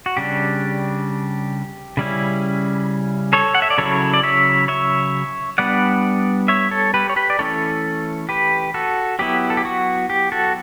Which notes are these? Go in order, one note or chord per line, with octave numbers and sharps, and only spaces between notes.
F#4
C#3 G3 D4 G4
C#3 G3 C#4 E4
A4 C#5
F#5
E5
D5
C#3 F#3 C#4 E4 A4 C#5
D5
C#5 E5
C#5 E5
G3 B3 D4 D5 F#5
C#5 E5
A4 C#5
G4 B4
C#5
G4 B4
D5
E3 A3 C#4 E4 A4 C#5
G4 B4
F#4 A4
F#3 B3 E4 G4
A4
G4
F#4
G4
F#4 A4